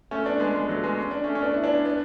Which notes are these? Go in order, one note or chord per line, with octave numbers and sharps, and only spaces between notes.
A3 C#4
B3 D4
G#3 B3
G#3 B3
F#3 A3
G#3 B3
C#4
D4
A3 C#4
C#4
B3 D4
E4
B3 D4
B3 D4